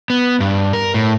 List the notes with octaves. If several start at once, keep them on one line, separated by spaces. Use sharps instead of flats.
B3
G2
A#4
A2